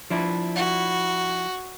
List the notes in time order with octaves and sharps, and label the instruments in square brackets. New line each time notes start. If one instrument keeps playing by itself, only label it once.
[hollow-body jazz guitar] F3 D4 E4
[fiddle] F#4